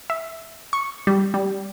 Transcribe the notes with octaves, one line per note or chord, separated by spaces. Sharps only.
E5
C#6
G3
G3